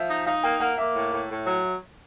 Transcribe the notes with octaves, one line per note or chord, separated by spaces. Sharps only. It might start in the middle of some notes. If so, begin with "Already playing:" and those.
Already playing: F3 E5
D#4
D#4 F5
A#3 G5
A#3 F#5
A#3 E5
A2
A2
A2
F#3